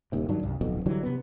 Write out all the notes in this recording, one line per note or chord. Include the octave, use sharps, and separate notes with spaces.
D#1 D#2 C3
G2 D#3 F#3 D4
C2 G2
D1 B1 F2 B2
D3 E3 F#3 G3
C3 B3